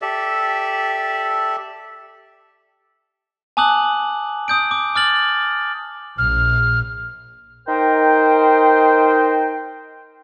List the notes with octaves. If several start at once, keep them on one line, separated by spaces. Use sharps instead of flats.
G4 A4 D5 E5
G#5 A5 D6 D#6 F#6 F#7
D#6
D#6 G6 D7
D6
D6 F6 A6 F#7
A#1 F6
D#4 A#4 C5 G5